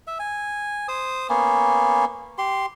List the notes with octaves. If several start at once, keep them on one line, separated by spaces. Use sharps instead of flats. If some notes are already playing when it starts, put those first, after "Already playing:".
E5
G#5
C5 D#6
A#3 B3 C#4
G4 C6